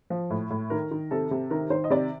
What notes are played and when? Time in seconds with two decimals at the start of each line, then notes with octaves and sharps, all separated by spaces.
0.10 F3
0.30 A2
0.50 A2
0.70 D#3 A#4
0.91 D#3
1.11 C3 A4
1.31 C3
1.51 D#3 A#4
1.70 D#3 C5
1.84 D#5
1.90 C3 D5